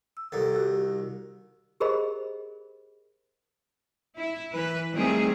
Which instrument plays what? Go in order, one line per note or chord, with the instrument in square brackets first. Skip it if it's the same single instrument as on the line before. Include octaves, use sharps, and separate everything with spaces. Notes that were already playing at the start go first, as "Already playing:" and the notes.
[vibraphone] E6
[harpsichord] C2 D#3 [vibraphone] A4
[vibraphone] F#4 G4 E6
[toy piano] G4 G#4 A#4 C5 D#5 B5
[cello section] E4
E3 B4
D#3 E3 G3 A3 C4 G#4